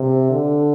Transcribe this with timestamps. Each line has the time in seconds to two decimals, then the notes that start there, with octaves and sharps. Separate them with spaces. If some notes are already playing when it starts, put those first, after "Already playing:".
Already playing: C3
0.31 D3